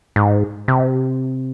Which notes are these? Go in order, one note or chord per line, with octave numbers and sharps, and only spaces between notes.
G#2
C3